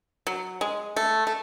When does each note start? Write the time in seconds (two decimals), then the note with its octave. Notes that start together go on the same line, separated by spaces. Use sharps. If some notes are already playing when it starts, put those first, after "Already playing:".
0.27 F#3
0.61 G#3
0.96 A3
1.27 A3